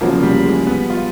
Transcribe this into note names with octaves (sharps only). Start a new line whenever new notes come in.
E2 C#3 F3 F#3 A#3
G3
G#3
B3
F4